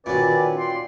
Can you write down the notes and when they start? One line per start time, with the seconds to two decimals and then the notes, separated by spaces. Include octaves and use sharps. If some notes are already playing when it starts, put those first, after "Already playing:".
0.06 A#2 D#3 F#3 C#4 B4 D5
0.59 D5 G5 C6